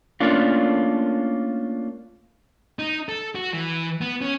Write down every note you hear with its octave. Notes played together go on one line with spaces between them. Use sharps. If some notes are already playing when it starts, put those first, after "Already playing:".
A3 A#3 C#4 D4 F4
D#4
A4
F#4
E3
B3
C#4